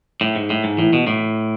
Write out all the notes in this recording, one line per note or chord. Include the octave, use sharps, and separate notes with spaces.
A2
G#2
A2
G#2
A2 E3
B2
A2